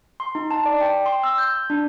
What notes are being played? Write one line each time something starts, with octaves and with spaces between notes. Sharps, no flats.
C6
D#4
A5
D5
G5
C6
E6
G6
D4